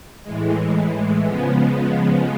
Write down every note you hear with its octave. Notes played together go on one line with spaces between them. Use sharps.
A2 E3 G#3
C#3 F3 G#3 B3